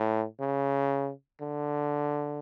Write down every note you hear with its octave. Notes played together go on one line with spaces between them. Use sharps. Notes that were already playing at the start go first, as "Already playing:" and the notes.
Already playing: A2
C#3
D3